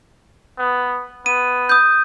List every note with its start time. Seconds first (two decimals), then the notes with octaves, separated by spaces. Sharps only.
0.58 B3
1.26 B3 D#7
1.69 D#6 G6